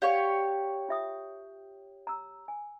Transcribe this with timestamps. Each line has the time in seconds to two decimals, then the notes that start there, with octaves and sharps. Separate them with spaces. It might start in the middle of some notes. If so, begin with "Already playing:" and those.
0.02 G4 C#5 D5 F5 F#5
0.89 F4 E5 D#6
2.07 A#5 E6
2.48 G#5